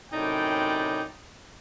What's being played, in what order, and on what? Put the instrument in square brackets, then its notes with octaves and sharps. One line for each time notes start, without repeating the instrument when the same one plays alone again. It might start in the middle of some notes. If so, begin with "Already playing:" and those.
[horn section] F#2 A2 C3 D#4 D5 G5